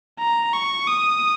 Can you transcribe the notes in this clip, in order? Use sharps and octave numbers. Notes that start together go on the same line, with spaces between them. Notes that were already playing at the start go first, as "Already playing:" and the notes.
A#5
C#6
D#6